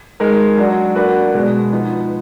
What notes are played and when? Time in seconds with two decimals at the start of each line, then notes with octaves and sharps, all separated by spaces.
0.20 G#3 D#4 A#4
0.57 F#3 D4 F#4
0.95 A#3 D4 F#4 B4
1.34 B2 G#3 B3
1.73 F3 B3 D#4